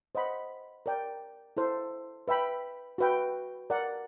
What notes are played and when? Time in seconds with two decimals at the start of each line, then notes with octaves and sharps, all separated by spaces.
0.15 C5 D#5 F#5 B5
0.86 A#4 D5 G5
1.57 E4 A4 C5
2.28 B4 E5 G5 B5
2.98 F#4 B4 E5 G5
3.70 A#4 D5 F#5